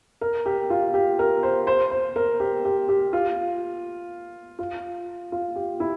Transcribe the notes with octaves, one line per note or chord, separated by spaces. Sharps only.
A#4
G4
F4
G4
A#4
C5
C5
C5
A#4
G4
G4
G4
F4
F4
F4
G4
E4